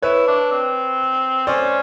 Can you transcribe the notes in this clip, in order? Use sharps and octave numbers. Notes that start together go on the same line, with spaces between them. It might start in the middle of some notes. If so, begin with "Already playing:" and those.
E4 B4 C#5
D4
C4
C#4 C5 D5